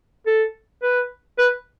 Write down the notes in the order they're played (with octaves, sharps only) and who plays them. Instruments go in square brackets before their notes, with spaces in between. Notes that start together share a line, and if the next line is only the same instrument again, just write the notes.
[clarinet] A4
B4
B4